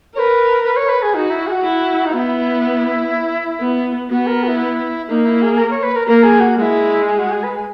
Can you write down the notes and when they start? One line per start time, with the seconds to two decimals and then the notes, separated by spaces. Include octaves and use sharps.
0.15 A#4 B4 C#5
0.64 B4
0.76 C#5
0.89 B4
1.02 G#4
1.14 D#4 F#4
1.30 E4
1.47 G#4
1.51 F#4
1.63 E4
2.05 D#4
2.12 B3 F#4
2.17 E4
3.61 B3
4.10 B3 F#4
4.27 A#4
4.43 F#4
4.48 E4
5.09 A#3 D#4
5.25 E4
5.42 G#4
5.58 A#4
5.70 C#5
5.83 B4
5.96 A#4
6.07 A#3 A#4
6.23 G#4
6.40 F#4
6.56 G#3 F#4
6.61 E4
7.06 G#4
7.18 F#4
7.31 G#4
7.43 B4
7.56 G#5